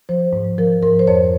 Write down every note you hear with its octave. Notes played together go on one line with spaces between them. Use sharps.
F3 C5
G#2
F3 A#4
G#2 A#4
C5
F2 C#5